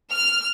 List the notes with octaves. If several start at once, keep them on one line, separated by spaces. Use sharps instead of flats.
F6